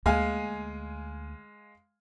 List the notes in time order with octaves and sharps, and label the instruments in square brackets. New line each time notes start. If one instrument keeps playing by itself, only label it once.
[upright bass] D2 A#3 [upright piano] G#3 F5 G#5